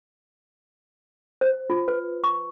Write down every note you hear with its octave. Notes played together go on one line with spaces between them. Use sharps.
C5
F4
B4
C#6